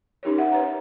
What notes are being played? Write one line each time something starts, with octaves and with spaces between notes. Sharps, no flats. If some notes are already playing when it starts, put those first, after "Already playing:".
C#4 D#4 G4 A#4 C#5
E5 F#5
B4 C#5 A#5